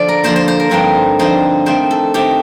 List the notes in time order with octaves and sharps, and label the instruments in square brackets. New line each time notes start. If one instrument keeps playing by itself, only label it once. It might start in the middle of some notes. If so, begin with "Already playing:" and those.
Already playing: [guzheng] D3 F3 D5
A#4
D3 F3 A#3 C5
C5
C5
A#4
G2 D3 F3 C4 D#4 A#4
G2 D3 F3 C4 D#4 C5
D#3 A3 C4 C5
A4
D#3 A3 C4 G4